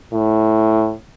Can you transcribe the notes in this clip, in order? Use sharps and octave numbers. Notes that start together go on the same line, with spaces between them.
A2